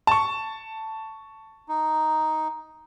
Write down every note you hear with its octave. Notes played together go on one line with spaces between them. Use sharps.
A5 C#6
D#4